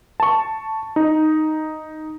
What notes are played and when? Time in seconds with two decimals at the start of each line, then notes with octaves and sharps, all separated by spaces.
0.20 A5 C#6
0.96 D#4